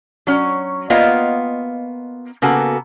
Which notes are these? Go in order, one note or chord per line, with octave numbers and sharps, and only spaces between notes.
F#3 C#4
A#3 B3 F4 D#5 F5 G5
C#3 A#3 B3 F#4 A4